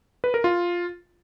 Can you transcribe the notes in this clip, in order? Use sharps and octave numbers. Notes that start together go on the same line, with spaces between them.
B4
A#4
F4